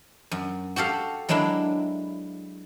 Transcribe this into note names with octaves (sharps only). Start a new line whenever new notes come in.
F#2
F#4 G4 A4 F5
F#3 G#3 A#3 D4 E4